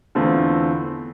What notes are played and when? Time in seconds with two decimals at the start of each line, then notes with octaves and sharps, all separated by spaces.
0.15 E2 D3 A3 C4 F4